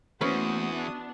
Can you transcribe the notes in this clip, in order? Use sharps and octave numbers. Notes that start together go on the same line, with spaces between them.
E2 A3 A#3 C#4 F#4 B4 C5 D#6
E3 B3 D4